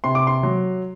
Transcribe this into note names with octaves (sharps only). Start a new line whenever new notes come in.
C3 C6
D6
C6
F#3